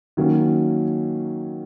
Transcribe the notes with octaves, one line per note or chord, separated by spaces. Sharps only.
D#3 F#3 A#3 C#4